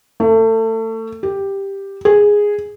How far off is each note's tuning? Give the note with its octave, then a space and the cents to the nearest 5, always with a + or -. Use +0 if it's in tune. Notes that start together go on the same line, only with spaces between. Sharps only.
A3 +30
G4 +5
G#4 -5